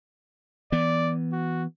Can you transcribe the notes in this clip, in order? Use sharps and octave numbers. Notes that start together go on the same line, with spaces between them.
E3 B3 D5
F#4